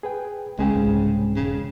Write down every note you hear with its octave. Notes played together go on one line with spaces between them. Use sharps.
G#4 B4 G5
C#2 C#3 G#3 G#4 G5
C2 G#2
E1 C#3